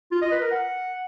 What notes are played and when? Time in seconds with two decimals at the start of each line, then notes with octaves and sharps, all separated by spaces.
0.12 F4
0.21 D#5
0.31 B4
0.41 A#4
0.51 F#5